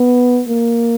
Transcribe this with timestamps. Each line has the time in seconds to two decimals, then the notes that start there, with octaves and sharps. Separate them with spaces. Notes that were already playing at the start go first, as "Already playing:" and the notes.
Already playing: B3
0.49 A#3